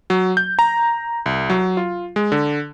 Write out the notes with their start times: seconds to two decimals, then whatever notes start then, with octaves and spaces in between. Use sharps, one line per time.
0.10 F#3
0.37 G6
0.59 A#5
1.26 C2
1.50 F#3
1.77 F4
2.16 G#3
2.32 D3